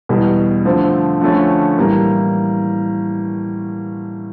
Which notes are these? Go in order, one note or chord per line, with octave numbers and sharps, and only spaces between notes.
E2 B2 G3
D3 F3 A3 C4
D3 F3 A3 C#4
A2 E3 G3 A#3